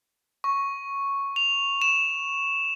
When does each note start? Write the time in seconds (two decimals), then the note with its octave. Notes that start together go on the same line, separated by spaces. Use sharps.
0.44 C#6
1.36 F7
1.82 E7